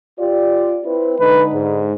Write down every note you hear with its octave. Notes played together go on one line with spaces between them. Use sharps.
F4 G4 D5
C4 E4 B4
D3 G#3 D#4 B4
G#2